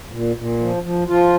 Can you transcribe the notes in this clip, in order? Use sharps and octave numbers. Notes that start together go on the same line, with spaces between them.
A#2
A#2
F3
F3
F3 F4